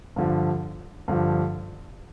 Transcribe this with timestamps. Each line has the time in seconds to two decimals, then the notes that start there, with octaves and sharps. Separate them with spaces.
0.16 G2 D3 F3
1.08 G2 D3 F3